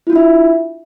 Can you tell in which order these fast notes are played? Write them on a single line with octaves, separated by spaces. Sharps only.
E4 F4 D4 E5